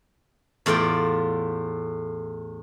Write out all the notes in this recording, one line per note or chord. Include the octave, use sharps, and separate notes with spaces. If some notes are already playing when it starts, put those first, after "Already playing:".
E2 A2 F4 D5 G5